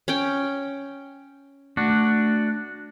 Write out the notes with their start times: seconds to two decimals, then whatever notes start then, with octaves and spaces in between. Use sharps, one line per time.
0.08 C#4 G5
1.77 A3 D4 F#4